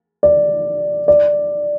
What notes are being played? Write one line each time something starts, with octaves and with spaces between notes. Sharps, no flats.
D5
D5